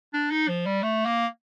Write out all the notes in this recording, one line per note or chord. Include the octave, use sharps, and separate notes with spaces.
D4
D#4
F3
G3
A3
A#3